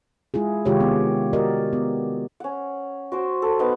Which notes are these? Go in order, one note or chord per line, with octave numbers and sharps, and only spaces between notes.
G#3 E4 F4 G#4
C3 D#3 G#3 F4 G4 C#5
B3
F#4 G4 A#4 D5 D#5
B3
C#4 F#5
F#4 C5 D6
A4
B3 D#4 F#5